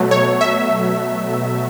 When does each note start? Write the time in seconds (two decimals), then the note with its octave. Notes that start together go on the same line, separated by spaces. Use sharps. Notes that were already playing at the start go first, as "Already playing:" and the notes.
Already playing: B2 F#3 A3
0.11 C#5
0.41 E5